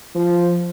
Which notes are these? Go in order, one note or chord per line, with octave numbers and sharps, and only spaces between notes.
F3